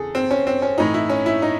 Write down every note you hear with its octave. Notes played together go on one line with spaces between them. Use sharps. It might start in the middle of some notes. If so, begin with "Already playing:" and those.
Already playing: E2 C#3 G#4 A4
C4
C#4
C4
C#4
A2 E3 D#4
E4
C#4
E4
D#4